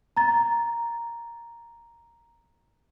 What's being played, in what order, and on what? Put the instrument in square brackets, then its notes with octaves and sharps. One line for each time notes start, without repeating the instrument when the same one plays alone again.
[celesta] A#5 A6